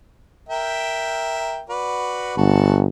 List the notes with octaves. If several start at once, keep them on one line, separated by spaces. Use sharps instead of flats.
A#4 E5 G5
F#4 B4 D5
G1 F#4 A5